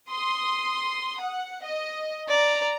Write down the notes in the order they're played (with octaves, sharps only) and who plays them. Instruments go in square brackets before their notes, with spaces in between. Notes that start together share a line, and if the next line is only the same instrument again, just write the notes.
[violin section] C6 D#6
F#5
D#5
[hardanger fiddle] D5 [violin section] A#5